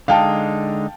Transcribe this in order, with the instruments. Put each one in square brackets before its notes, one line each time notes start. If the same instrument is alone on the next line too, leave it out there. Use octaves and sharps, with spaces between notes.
[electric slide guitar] D3 G#3 D#4 [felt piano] F5 G5 A5